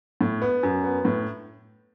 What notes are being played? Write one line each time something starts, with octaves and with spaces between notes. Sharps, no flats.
A2
B3
F#2
B3
A2